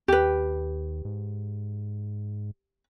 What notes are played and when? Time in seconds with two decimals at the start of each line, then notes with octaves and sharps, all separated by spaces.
0.08 D#2 G4 B4
1.05 G#2